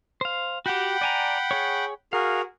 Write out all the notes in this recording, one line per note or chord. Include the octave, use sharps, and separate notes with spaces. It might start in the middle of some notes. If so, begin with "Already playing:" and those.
C5 F5
F#4 G4 F#5 G5 B5
D5 G#5 A#5
G#4 C#5
F#4 G#4 A#4 F5